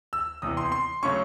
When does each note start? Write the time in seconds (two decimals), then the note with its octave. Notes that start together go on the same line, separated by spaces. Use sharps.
0.13 E6
0.42 E2 C3 E3 D#6
0.57 C6
0.72 C6
1.03 C#3 F#3 A3 C#4 C#6